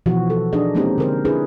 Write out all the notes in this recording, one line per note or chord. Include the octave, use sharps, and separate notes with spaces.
B2 E3 F3 F#4
A4
D4 D#4 G#4 D#5
G#3 A#3 C4 C#4 D#4 G4
D3 C4 A#4 C5
D4 E4 G#4 B4